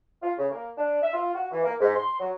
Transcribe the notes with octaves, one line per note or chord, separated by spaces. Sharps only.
F4
C#3
A#3
D4
E5
F4
F#4
E3
A#3
G#2
C6
F#3